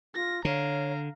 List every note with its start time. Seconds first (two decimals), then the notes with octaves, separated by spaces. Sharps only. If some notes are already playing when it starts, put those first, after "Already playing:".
0.15 F4 A#6
0.45 D3 C#5 F5 A#5